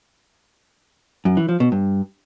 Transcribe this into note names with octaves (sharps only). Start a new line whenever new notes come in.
F#2
E3
F3
B2
G2